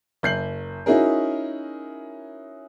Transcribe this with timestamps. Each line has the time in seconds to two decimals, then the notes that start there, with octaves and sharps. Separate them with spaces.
0.23 F#1 G6 C7 F#7
0.86 C#4 D#4 E4 F#4 G#4 A#4